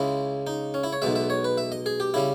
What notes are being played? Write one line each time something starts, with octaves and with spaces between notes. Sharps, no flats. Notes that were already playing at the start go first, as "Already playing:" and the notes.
Already playing: C#2 C#3 G#3 E4
D#4
C#4
E4
C#5
B1 B2 G#3 E5
E5
C#5
B4
E5
D#5
G#4
G4
C#3 G3 E4